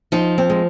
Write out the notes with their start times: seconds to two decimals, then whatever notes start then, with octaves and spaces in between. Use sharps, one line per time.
0.12 F3 D#4
0.38 C4
0.50 G#3